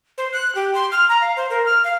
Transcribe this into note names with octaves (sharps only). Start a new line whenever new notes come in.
C5
F#6
G4
C6
F6
A#5
F5
C5
A#4
F6
F5